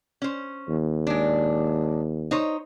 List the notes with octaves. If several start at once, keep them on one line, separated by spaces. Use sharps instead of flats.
C#4 C5
D#2
G#3 D4
D#4 C5 C#5